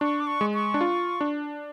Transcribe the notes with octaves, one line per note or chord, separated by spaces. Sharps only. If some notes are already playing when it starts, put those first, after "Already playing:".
D4 C#6
D6
C#6
G#3
C#6
D4
F4
D4